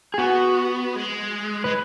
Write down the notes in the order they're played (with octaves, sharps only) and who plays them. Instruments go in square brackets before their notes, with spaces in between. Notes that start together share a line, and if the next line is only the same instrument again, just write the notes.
[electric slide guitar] G#4
[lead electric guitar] B3 [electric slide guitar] F#4
[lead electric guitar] G#3
[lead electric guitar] G#3 [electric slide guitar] B4